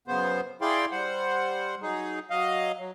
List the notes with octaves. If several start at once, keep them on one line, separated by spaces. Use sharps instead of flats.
F#2 C#3 B3 C5
E4 G#4 D5 F5 G5 C6
G3 C5 F#5
F#3 D#4 G#4
F#3 D#5 F5
F#3